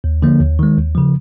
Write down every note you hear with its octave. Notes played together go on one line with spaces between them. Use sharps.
D#2
D3 F3 A#3
D#2
D#3 G#3
D#2
C#3 F3